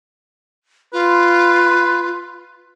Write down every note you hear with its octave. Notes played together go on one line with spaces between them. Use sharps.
F4 B4